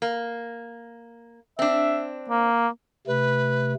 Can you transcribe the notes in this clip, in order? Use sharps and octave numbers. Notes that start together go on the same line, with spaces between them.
A#3
C4 D4 E5
A#3
C3 A3 B4